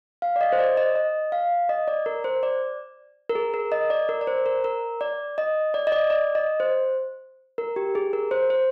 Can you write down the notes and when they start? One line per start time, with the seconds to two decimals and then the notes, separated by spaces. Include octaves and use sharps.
0.22 F5
0.36 D5
0.41 D#5
0.53 C5
0.59 D5
0.77 D#5
0.95 D#5
1.32 F5
1.69 D#5
1.88 D5
2.06 A#4
2.24 C5
2.43 D5
3.29 A#4
3.35 G#4
3.54 A#4
3.72 D#5
3.90 D5
4.09 A#4
4.21 D5
4.27 C5
4.46 A#4
4.64 A#4
5.01 D5
5.38 D#5
5.74 D5
5.87 D#5
5.92 D5
6.10 D5
6.35 D#5
6.60 C5
7.58 A#4
7.76 G4
7.95 G#4
8.13 A#4
8.31 C5
8.50 C5